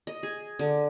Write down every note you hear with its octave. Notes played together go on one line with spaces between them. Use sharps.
D#5
G#4
D3